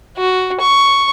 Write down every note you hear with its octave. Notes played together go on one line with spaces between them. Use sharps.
F#4
C#6